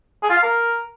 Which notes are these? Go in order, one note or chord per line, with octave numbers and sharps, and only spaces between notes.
G#4
F4
F5
A#4